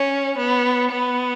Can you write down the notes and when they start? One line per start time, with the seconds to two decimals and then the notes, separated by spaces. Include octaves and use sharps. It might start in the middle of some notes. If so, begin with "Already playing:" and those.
Already playing: C#4
0.38 B3
0.91 B3